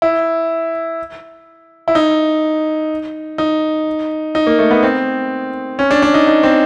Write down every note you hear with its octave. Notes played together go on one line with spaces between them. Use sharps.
E4
E4
D#4
D#4
D#4
A#3
A3
B3
C4
C#4
D4
D4
D#4
D#4
C4